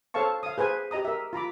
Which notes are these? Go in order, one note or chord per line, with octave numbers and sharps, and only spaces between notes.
A4 C5 C#5 F5 A5 C#6
F5 D#6
G#4 B4 C5 G#5
G4 D#5 A#5 D#6
A#4 E5
F4 A#5 B5 D6